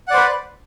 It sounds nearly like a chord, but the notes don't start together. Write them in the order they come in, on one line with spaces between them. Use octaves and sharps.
F#5 D5 C5 B4